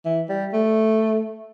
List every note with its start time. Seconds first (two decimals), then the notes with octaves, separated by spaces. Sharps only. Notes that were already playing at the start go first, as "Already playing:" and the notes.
0.05 E3
0.29 G3
0.53 A3